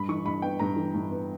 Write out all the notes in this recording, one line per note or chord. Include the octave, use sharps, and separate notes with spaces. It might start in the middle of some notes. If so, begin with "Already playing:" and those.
Already playing: G2 B5
E3 C#6
G2 B5
B3 G5
G2 A#5
E3
G2
B3